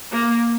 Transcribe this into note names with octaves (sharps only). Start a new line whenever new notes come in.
A#3